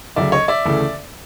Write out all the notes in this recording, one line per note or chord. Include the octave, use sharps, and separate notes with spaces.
D2 C#3 F#3 D5 E5
C#5 D#5
D5 E5
D2 C#3 E3 A3